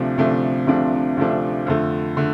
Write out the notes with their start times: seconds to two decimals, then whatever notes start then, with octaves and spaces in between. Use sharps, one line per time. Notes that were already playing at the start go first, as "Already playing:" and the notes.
Already playing: D2 C3 F3 A3 D4
0.18 D2 C3 F3 A3 D4
0.67 D2 C3 F3 A3 D4
1.17 D2 C3 F3 A3 D4
1.67 F2 D3 A3
2.17 D3 A3